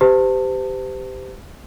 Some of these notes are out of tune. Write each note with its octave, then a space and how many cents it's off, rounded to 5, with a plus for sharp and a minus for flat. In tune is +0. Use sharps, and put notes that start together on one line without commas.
G4 +0 C5 -40 A5 +25